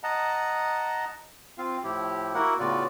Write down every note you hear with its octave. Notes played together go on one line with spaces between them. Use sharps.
D#5 F#5 A5 A#5
C4 F4 F5
A2 F3 E4 G4
A#3 E4 F#4 A#4 F#5
A2 C#3 B3 F4 F#4 D5